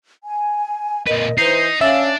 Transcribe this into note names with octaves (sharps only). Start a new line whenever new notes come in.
G#5
A#2 A#4 B4 D#5
E3 D#4 B4 C5 G6 C7
C#4 D4 E5 F5